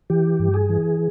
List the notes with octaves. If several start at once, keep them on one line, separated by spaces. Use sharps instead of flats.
E3 G4
G2
G#4
E3